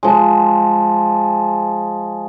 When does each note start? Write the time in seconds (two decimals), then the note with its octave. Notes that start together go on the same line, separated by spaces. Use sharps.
0.03 F3 G#3